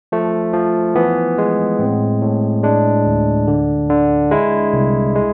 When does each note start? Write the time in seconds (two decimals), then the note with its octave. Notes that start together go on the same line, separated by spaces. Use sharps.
0.12 F3 A3
0.53 F3
0.95 E3 B3
1.38 G#3
1.79 A2 C4
2.22 A2
2.63 G#3 D4
3.06 D2
3.48 D3
3.90 D3
4.31 G#3 E4
4.73 C2
5.15 G#3